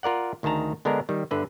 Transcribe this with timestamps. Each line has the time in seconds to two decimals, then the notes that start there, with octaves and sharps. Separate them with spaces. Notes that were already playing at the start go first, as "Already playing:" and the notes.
0.03 F4 A#4 D5 F#5
0.43 D2 D#3 G#4 A5 A#5
0.85 D3 G#3 B3 D4 A#4
1.09 D#3 G3
1.31 G1 D3 B4 E5